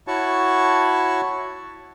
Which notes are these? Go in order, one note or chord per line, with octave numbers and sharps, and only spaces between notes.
E4 F#4 C#5 A5 C#6